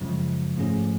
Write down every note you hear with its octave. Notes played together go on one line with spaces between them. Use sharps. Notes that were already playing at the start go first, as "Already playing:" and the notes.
F#2 C#3 F3 G#3
G#2 F3 A3 C#4 G#4